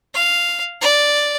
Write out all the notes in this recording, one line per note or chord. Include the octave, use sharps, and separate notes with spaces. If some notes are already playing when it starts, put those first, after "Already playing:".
F5
D5